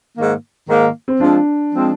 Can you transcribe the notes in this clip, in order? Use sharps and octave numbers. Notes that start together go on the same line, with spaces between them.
G#2 D#3 A#3
G#2 D#3 A#3
C4
F3 G#3 C4 D4 F4
F3 G#3 C4 F4